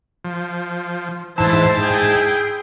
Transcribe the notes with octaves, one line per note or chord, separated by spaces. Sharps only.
F3
G#2 E3 E4 C5 A5
G#4 G5